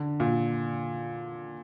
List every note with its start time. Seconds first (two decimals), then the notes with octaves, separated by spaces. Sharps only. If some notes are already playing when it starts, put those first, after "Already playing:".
Already playing: D3
0.20 A#2